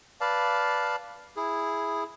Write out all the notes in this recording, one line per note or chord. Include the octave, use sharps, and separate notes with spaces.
B4 D5 F5 A5
E4 G#4